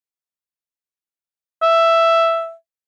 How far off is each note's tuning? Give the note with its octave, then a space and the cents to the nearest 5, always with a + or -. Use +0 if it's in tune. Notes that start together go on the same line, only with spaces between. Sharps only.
E5 +5